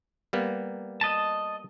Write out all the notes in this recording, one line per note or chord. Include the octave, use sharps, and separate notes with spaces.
G3 A#3 B3
D#5 A5